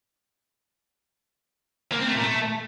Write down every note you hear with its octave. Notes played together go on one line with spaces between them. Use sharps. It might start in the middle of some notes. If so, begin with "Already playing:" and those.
A#3
C4
A3
A#2
A3